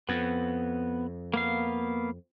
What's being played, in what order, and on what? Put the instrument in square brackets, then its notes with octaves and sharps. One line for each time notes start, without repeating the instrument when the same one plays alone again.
[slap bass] F2 [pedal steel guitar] B3
[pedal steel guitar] A#3 B3 F5